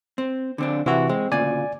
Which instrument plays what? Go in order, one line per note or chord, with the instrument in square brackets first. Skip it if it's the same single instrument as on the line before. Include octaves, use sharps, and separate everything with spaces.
[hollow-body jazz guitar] C4
D3 C4 D4
[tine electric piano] C3 E3 F#4 [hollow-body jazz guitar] E4
[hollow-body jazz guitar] G#3 [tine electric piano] C4
[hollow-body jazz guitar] D2 A#2 C#3 [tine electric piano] D5 G#5